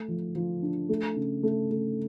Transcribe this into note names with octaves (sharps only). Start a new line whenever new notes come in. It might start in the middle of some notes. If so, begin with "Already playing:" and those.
Already playing: A3
F3
F3
D4
A3
C#3
A3
A3